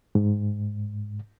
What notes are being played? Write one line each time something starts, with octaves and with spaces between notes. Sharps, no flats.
G#2